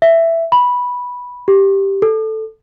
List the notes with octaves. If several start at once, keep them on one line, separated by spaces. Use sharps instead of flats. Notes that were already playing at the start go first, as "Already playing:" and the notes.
E5
B5
G4
A4